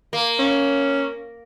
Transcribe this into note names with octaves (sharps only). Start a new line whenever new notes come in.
A#3
C#4